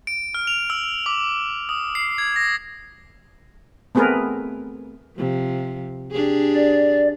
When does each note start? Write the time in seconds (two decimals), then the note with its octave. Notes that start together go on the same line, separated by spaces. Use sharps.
0.07 D7
0.34 F6
0.47 F7
0.70 E6
1.06 D6
1.69 D#6
1.95 C7
2.18 G#6
2.36 A#6
3.95 A3 B3 C4 G#4 A#4 B4
5.17 C3 F3
6.11 D4 G4 G#4
6.54 D5